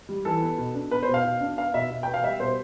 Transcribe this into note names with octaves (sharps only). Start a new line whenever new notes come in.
G3
E3 A4
B3
B2
D4
B3 B4
C5
B2
F5
B2
D4
B3 F5
B2 E5
B2
B3 G5
F5
G3 E5
B2 C5